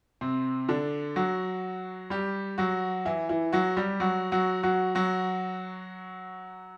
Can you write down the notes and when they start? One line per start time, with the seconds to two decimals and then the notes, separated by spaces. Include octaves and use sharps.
0.21 C3 C4
0.69 D3 D4
1.16 F#3 F#4
2.10 G3 G4
2.58 F#3 F#4
3.05 E3 E4
3.29 E3 E4
3.53 F#3 F#4
3.77 G3 G4
4.00 F#3 F#4
4.32 F#3 F#4
4.63 F#3 F#4
4.95 F#3 F#4